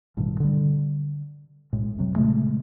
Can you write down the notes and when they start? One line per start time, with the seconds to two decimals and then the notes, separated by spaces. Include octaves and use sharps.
0.17 A1 G2 B2 D#3
0.40 D3 G3
1.73 B1 A2 G#3
1.96 F1 B1 C3 F#3
2.16 A#2 C#3 G#3 A3